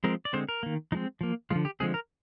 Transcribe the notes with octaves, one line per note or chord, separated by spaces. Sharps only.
F3 G#3 C4 A#4
D5
D3 G#3 C4 C5
A#4
D#3 A#3
F3 G#3 C4 D#4
F3 A#3
D3 F3 G#3 F4
G4
D3 F3 G#3 C4 G#4
A#4